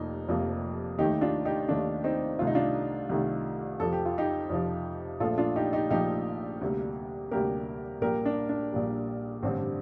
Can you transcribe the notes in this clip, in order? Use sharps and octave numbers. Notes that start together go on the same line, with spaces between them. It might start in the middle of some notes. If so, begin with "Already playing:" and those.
Already playing: F1 F2 C3 F3 A#3 D#4
F1 F2 C3 F3 A#3
D#2 D#3 A3 D#4 G4
D4 F4
D#4 G4
D#2 D#3 A3 D4
C4 D#4
C2 C3 D#3 A3 F4
D#4
D4 F4
C2 C3 D#3 A3
F2 C3 F3 A4
G4
F4
D#4 G4
F2 C3 F3
A#1 A#2 F3 A3 F4 A4
D4 F4
D#4 G4
D#4 G4
A#1 A#2 F3 A3 D#4 G4
D2 C3 G3 A#3
D2 C3 G3 A#3 G4 A#4
A#1 A#2 G3 G4 A#4
D4
D4
A#1 A#2 G3
A1 G2 D3 G3 C4